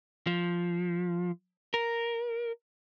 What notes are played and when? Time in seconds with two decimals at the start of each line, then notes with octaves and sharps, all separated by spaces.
0.27 F3
1.74 A#4